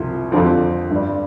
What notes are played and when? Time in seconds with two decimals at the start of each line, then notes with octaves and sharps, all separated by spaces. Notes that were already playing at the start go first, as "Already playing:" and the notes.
Already playing: C2 C3 F3
0.32 F2 D3 F3 C4
0.91 G2 G3